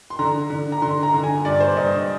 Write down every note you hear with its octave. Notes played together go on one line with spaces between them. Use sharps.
C6
D3 A#5
D3
A#5
D3 C6
A#5
D3
G#5
G2 D5
C5
G2 D#5